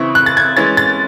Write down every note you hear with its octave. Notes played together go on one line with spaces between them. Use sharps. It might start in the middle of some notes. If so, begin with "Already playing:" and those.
Already playing: C#3 E3 C4 E4 C#6
F#6
A6
G#6
E3 G#3 C#4 A6
A6